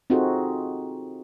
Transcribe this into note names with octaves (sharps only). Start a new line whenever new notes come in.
C4 D#4 F4 F#4 G#4 A4